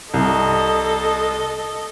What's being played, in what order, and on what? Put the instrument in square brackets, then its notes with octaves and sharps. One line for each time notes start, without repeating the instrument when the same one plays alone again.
[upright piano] C2 [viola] A4 D#5